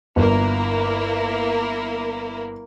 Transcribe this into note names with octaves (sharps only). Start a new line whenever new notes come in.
G1 A#3 E4 A#4